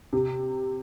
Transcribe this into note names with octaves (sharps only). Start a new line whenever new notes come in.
C3